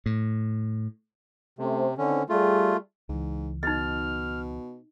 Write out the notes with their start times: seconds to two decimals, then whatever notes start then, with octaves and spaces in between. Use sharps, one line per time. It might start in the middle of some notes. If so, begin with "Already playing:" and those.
0.06 A2
1.59 C3 A3 C#4 C5
1.98 D3 D#3 C4 C#4
2.29 G3 A3 F4 G#4
3.09 C#2 G#2 E3
3.63 B2 D#4 D#5 F6